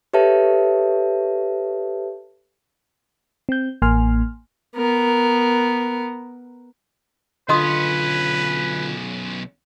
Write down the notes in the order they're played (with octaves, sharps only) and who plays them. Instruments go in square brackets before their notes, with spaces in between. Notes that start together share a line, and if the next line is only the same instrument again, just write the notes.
[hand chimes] G4 A4 B4 C#5 E5 A5
[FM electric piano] C4 G6
A1 A#3 G#5 C6 F6
[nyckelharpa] B3 A#4
[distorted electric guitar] B1 C#4 [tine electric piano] D3 F4 [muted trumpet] B4 [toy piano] D#5 C6 D#6